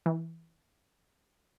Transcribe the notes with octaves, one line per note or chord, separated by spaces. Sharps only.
E3